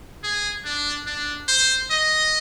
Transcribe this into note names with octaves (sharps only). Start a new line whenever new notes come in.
G#4
D4
D4
C5
D#5